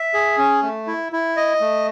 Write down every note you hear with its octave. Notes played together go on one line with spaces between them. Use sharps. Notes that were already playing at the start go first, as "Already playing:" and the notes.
Already playing: E5
G#4
C#4
A3
E4
E4
D#5
A3